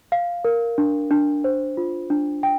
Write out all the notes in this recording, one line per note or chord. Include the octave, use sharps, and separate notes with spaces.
F5
A#4
D4
D4
C5
F4
D4
G5